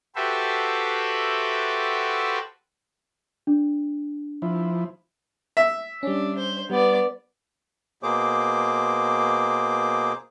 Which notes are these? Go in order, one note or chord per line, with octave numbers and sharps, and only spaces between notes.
F#4 G4 A4 B4 C5 E5
D4
F3 E4
E5
G3 C#4 D4
C5
G3 B3 D5
B2 A#3 G#4 C5 D6